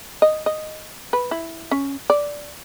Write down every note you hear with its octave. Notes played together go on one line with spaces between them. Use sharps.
D#5
D#5
B4
E4
C#4
D5